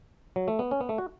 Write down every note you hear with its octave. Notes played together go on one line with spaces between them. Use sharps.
F#3
A3
B3
C#4
B3
A3
F#4